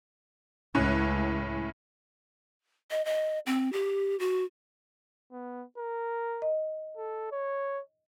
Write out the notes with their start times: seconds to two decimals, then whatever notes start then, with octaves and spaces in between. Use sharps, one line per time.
0.75 C#2 A2 C#4 F#6
2.91 D#5
3.05 D#5
3.46 C4
3.73 G4
4.20 F#4
5.32 B3
5.78 A#4
6.42 D#5
6.97 A4
7.32 C#5